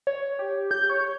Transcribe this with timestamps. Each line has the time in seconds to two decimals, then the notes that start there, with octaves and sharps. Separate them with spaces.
0.07 C#5
0.39 G4
0.71 G6
0.90 C#5